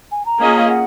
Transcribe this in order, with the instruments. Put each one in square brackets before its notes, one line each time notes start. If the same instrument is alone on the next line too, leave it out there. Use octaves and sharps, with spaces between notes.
[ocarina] G#5
A#5
[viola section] A#3 C#4 F4 G#4 D#5
[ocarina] F5
F#5